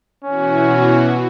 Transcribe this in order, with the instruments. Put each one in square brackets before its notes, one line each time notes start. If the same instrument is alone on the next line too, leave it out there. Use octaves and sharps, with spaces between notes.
[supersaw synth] B2 E3 F#4 [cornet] C#4